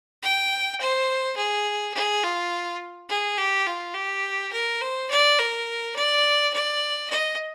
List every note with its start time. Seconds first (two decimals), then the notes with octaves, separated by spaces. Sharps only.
0.23 G5
0.81 C5
1.37 G#4
1.94 G#4
2.23 F4
3.09 G#4
3.38 G4
3.67 F4
3.95 G4
4.53 A#4
4.81 C5
5.11 D5
5.39 A#4
5.96 D5
6.54 D5
7.10 D#5